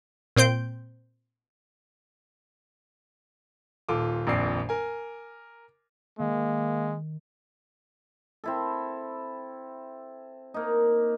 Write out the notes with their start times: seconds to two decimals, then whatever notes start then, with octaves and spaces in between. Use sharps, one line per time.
0.36 A#2 C4 C5 G6 D7
3.89 D#1 F4 A4 D6
4.26 D#1 A#1 F2 D5 C7
4.69 A#4 G#5
6.19 D#3 G#3 A#3
8.44 C4 E4 A4
10.54 A#3 D#4